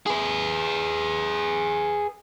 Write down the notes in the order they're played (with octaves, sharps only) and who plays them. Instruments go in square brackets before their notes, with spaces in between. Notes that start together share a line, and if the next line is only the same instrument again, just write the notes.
[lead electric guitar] G#4 B4